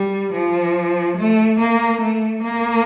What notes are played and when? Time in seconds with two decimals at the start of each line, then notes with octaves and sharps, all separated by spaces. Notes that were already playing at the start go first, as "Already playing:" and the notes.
Already playing: G3
0.33 F3
1.17 A3
1.59 A#3
2.01 A3
2.43 A#3